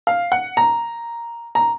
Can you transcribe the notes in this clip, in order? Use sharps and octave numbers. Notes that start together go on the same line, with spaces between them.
F5
F#5
A#5
A#5